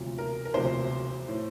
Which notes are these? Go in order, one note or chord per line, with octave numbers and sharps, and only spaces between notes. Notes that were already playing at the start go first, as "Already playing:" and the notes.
Already playing: E1 D2 C3 F3
A#4
A#4
E1 D2 C3 F3 C5
A2 E3